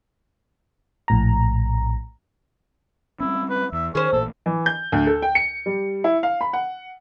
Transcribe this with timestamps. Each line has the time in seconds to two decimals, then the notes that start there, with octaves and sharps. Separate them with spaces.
1.08 A#1 A2 A#5
3.20 G3 C4 C#4 E4
3.50 B4
3.72 E2 E5
3.95 D#3 C#4 G#4 C5
4.13 A1 A#2 A4
4.46 E3
4.66 G6
4.92 D2
5.07 A4
5.22 G5
5.35 C#7
5.66 G3
6.04 E4
6.23 F5
6.41 B5
6.53 F#5